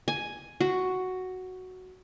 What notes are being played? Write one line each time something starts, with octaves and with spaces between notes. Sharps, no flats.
G#5
F#4